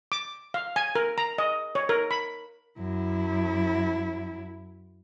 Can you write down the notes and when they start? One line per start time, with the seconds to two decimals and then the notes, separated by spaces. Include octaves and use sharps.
0.12 D6
0.54 F5
0.76 G#5
0.95 A#4
1.18 A#5
1.38 D#5
1.75 C#5
1.89 A#4
2.11 B5
2.79 F#2 E4